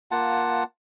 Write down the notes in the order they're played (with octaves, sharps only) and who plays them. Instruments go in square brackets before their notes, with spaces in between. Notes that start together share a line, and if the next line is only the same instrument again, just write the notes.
[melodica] A#3 F4 F#5 A5